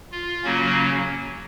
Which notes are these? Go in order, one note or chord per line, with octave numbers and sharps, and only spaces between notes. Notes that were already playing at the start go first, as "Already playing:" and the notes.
F4
C#3 F#3 A#3 C#4 F#4